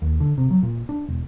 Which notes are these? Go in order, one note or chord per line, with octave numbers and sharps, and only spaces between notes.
D#2
D3
C3
F#3
A#2
D4
E1